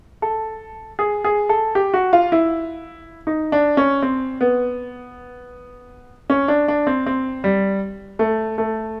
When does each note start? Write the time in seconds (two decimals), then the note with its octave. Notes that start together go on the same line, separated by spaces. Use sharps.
0.22 A4
0.99 G#4
1.24 G#4
1.49 A4
1.75 G4
1.94 F#4
2.13 F4
2.32 E4
3.27 D#4
3.52 D4
3.77 C#4
4.02 C4
4.41 B3
6.30 C#4
6.48 D4
6.68 D4
6.87 C4
7.06 C4
7.44 G3
8.19 A3
8.58 A3